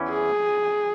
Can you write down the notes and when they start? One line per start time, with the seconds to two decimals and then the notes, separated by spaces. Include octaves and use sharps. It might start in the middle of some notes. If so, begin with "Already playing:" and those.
Already playing: E2 E3 C#4 E4
0.10 G#4